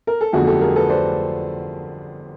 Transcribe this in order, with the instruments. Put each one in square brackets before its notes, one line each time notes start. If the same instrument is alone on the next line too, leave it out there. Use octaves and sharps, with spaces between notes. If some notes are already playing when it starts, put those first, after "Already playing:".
[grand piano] A#4
A4
G1 F2 D3 F#3 A3 F#4 G#4
G4 A4
G#4 A#4
A4 B4
C5 D5